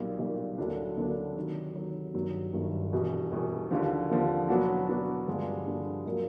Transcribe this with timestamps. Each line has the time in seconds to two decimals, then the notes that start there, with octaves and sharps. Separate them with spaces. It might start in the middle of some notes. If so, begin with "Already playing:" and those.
Already playing: B1 A#2 G3
0.19 B1 A#2 G3
0.58 D2 D3 F#3 A#3 D4
0.97 D2 D3 F#3 A#3 D4
1.36 C3 D#3 F#3
1.76 C3 D#3 F#3
2.14 G1 G2 D#3 F#3
2.54 G1 G2 D#3 F#3
2.93 E1 E2 B2 G3
3.32 E1 E2 B2 G3
3.71 D#2 D3 F3
4.10 D#2 D3 F3
4.49 B2 F#3 B3 D4 F#4
4.88 B2 F#3 B3 D4 F#4
5.27 G2 D3 F3 G#3
5.66 G2 D3 F3 G#3
6.06 A#2 F#3 A#3